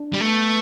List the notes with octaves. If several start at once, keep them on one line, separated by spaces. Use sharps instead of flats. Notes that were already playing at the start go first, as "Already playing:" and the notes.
Already playing: D4
G3
A3 B3